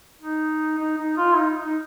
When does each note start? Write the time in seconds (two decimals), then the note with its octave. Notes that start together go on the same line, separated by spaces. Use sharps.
0.21 D#4
0.78 D#4
0.98 D#4
1.17 F4
1.36 D#4
1.65 D#4